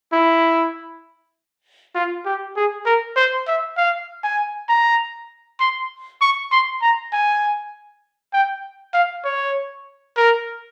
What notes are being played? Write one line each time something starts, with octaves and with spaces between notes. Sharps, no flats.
E4
F4
G4
G#4
A#4
C5
E5
F5
G#5
A#5
C6
C#6
C6
A#5
G#5
G5
F5
C#5
A#4